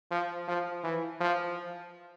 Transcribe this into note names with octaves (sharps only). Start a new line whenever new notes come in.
F3
F3
E3
F3